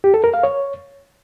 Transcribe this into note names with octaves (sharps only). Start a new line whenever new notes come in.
G4
A4
A#4
F5
C#5